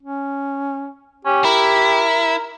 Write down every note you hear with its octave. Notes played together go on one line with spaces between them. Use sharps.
C#4
C#4 G4
E4 A#4